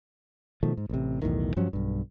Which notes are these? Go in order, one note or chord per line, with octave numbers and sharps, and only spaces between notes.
B2 D#3 F3 A3
G#2
A1 C3
B1 E2 A2 D#3
G2 F3 F#3 C#4
B1 G2